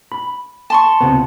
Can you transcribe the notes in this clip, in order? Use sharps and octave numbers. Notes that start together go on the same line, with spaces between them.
B5
A5 C6 C#6
C#2 C3 B3